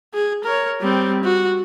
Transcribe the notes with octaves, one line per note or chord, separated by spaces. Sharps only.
G#4
A#4 C#5
G3 C4
F#4